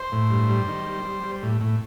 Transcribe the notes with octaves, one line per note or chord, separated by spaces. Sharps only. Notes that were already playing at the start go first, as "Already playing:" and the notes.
Already playing: C5
A2
G2
G3
D#3
G3
G3
G3
A2
A2